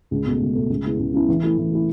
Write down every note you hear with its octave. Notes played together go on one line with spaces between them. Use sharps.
C#2
B2 A3
C#2
B2 A3
C#2
C#3 G#3 B3 E4
C#2
C#3 G#3 B3 E4
E3
A3 E4
E3
A3 E4